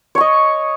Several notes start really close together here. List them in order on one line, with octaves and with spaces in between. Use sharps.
C#5 C#6 D#5